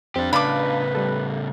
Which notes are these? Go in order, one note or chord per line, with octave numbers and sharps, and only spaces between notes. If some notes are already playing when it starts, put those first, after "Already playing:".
F2 C4 D4 G4
A2 C#3 D4 B4 F5 A5 B5 D6
G3 A4